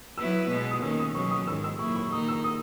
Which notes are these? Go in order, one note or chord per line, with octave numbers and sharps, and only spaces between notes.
F#3 B3 E4 B4 E6
B2 G#3 B3
D#6
D#3 A#3 C#4 E6
D#6
B2 F#3 C#4 C#6
D#6
G#2 D#3 G#3 E6
E6
A#2 F#3 A#3 E4 C#6
C#6
D#3 A#3 D#4 D#6
E6
D#6